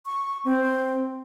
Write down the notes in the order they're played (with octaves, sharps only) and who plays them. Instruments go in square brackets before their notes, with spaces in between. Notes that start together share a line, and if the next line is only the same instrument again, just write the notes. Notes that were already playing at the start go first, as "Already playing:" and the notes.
[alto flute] C#6
C4